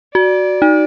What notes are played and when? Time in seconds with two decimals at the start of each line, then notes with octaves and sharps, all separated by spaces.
0.15 F#4 D5
0.62 D#4